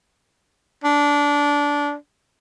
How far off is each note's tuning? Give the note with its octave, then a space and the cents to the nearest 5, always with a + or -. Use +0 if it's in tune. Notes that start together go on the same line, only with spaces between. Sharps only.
D4 -20